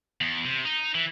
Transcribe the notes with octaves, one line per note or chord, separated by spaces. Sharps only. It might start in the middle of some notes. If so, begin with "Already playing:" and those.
E2
C3
D#4
E3